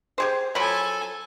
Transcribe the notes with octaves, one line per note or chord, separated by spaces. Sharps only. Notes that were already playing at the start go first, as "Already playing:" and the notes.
G4 G#4 C5
F3 F#3 A4 G#5 B5